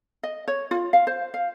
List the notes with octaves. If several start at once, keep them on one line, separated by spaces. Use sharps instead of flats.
D#5
C#5
F4
F5
C5
F5